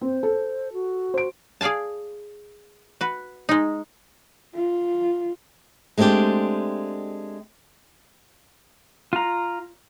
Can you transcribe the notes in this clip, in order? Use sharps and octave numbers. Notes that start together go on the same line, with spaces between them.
C4 C5
A4
F#4
C5 D7
G#4 D5 F5 G#5 A5
F#4 B4
G#3 D#4
F4
G#3 A3 C4 D4 G4
F4 A#5